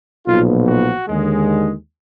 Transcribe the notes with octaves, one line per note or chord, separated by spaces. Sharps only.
B1 A#2 F3 B3 F4
F#4
D#2 D3 G#3